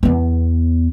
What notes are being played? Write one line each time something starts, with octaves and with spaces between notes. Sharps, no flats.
E2 B3